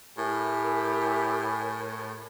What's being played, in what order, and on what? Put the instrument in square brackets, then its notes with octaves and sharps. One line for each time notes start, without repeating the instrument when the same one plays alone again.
[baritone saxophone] A2 [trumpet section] E4 G4 [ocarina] A#4 [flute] G#5